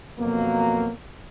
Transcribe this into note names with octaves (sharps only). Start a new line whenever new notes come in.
F2 B2 F#3 A#3